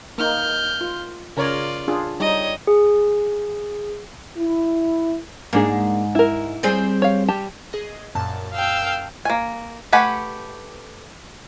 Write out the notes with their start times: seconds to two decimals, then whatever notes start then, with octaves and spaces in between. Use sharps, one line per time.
0.18 A#3 D#4 F6 G6
0.81 F4
1.37 C#3 F4 A#4 C#5 D5
1.88 D4 F4 G#4
2.20 G3 D#4 C#5 D#5
2.67 G#4
4.36 E4
5.53 G#2 A#3 D4 G#4
6.15 E4 A#4
6.63 G3 C4 G#4
7.02 C#5 F5
7.28 G3 G4 A5
7.73 G#4 D#5
8.15 F#2 A#2 A5
8.54 F5 G5 E6
9.25 A#3 G#5
9.93 A3 G4 B4 F#5 G#5